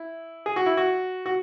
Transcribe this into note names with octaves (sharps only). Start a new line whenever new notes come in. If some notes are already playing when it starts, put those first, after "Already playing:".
Already playing: E4
G#4
F#4
E4
F#4
F#4